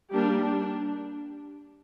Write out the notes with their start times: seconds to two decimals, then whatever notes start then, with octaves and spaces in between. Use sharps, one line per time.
0.11 G3 A#3 D4 G4
0.42 D4